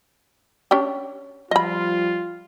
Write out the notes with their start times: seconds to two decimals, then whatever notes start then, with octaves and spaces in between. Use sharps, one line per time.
0.71 C#4 D4 G4
1.51 F3 G3 F4 D#5 B5